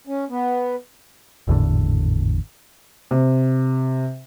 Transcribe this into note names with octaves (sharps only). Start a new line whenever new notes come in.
C#4
B3
G#1 E2 A2 D3
C3